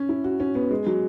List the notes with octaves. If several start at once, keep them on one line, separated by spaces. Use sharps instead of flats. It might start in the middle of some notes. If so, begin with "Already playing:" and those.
Already playing: C#4
E4
F#4
C#4
B3
G#3
F#3